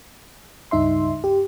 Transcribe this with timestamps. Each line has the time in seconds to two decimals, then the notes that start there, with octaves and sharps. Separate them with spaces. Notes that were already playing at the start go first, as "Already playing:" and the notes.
0.71 C#2 G2 D#4 E5 C6
1.24 G4